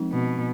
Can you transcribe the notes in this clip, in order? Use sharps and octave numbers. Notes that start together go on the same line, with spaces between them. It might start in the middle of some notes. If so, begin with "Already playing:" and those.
Already playing: F3 G#3 C4 D#4
B2